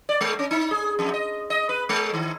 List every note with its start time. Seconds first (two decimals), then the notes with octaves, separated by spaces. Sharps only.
0.09 D5
0.21 G#3
0.39 C#4
0.51 D#4
0.71 G#4
0.99 F2
1.14 D#5
1.50 D#5
1.69 B4
1.89 G#3
2.14 D#3